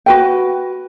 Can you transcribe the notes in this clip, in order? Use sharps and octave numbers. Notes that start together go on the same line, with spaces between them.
F#4 B4 G5